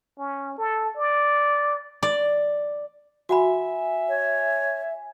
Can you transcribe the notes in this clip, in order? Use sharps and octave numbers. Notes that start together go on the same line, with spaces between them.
C#4
A4
D5
D5
F#4 E5 F#5 G#5 B5
C#5